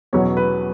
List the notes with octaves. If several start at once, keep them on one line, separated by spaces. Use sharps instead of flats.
E2 B2 F#3 C#4 C#5
B4